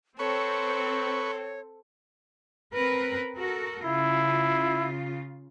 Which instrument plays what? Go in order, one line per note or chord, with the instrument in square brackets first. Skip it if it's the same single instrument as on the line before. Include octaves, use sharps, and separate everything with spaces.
[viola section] C4 [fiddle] A4 [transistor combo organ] B4 C#6 [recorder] C#5
[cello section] C4 A#4 B4
F#4 A4 A#4
[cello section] C#3 F4 [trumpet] E4